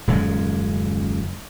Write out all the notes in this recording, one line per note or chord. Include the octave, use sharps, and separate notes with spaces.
D#1 F#2 C#3 G#3